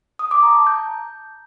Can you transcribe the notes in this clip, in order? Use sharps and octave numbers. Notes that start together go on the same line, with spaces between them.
D#6
D6
A#5
A5
G6